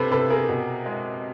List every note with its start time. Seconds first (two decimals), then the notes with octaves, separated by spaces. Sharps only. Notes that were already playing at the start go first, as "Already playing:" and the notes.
Already playing: C3 A4 B4 C5
0.11 C3 A4 B4
0.30 G#4 A#4
0.49 B2
0.86 G#3